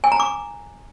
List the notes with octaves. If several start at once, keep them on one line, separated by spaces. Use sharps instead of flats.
G#5
A#5
D6